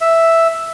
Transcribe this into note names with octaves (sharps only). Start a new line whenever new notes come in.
E5